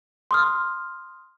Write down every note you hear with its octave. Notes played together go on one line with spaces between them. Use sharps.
C6 D#6 F6